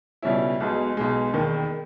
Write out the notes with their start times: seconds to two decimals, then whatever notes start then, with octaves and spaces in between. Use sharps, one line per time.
0.22 C#2 B2 G3 C#4 E4
0.60 B1 B2 G#3
0.97 B1 B2 G#3
1.33 E1 D#2 D#3